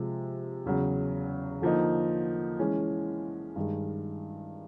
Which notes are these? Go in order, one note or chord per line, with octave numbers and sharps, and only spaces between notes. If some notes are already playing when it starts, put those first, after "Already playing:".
Already playing: C3 F3 G#3
E2 C#3 F#3
D3 F3 A#3 D#4
E3 G#3 C#4
G2 D#3 G#3